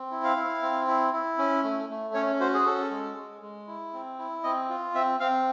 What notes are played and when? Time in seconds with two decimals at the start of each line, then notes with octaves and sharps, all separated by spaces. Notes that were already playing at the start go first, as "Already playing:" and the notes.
Already playing: C4
0.11 E4
0.24 F5
0.36 E4
0.62 C4
0.87 E4
1.13 E4
1.38 C#4
1.64 A3
1.90 A3
2.14 C#4 C#5
2.40 F#4 C5
2.54 G#4
2.65 C#4 A4
2.91 G#3
3.17 G#3
3.42 G#3
3.67 E4
3.93 C4
4.18 E4
4.44 C4 D#5
4.69 F4
4.94 C4 E5
5.20 C4 F5